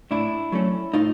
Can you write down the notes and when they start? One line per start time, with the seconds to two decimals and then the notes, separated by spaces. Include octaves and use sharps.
0.11 A2 D4 E4
0.52 F#3 A3 C#4
0.94 A2 D#4 F4